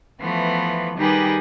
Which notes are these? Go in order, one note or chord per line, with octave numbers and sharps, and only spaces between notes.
E3 F3 A3 B3
D#3 G3 D#4 G4 G#4 B4